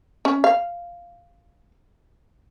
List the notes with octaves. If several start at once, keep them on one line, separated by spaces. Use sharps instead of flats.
C#4
F5